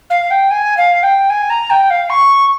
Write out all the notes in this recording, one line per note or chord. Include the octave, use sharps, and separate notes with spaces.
F5
G5
G#5
F5
G5
G#5
A#5
G5
F5
C#6